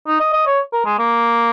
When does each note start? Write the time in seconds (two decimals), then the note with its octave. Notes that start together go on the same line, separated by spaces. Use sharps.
0.07 D#4
0.20 D#5
0.33 D#5
0.47 C#5
0.73 A#4
0.85 G#3
0.99 A#3